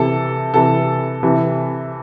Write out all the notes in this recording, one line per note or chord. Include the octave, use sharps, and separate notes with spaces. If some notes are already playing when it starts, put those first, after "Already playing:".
Already playing: C3 E3 A4
C3 E3 A4
C3 E3